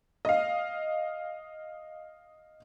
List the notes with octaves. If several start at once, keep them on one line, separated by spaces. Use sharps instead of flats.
D#5 F5